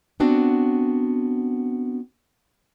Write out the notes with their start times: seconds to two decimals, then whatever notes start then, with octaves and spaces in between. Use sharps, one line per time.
0.20 B3 C4 D4 F#4